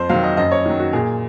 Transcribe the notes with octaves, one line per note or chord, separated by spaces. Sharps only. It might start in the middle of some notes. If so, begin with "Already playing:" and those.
Already playing: F2 C5
D#3 F#3 F5
D#5
F#2 D#5
C#5
D#3 F#3
F#4
A#2 G#4